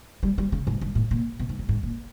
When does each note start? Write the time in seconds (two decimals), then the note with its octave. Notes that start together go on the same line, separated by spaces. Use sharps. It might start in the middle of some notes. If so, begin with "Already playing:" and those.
0.23 G3
0.38 G3
0.52 C#3
0.67 G#2
0.81 G2
0.95 A2
1.11 A#2
1.39 B2
1.49 G#2
1.59 G2
1.69 G#2
1.83 A#2